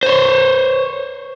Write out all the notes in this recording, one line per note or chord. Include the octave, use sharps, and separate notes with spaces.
C5 C#5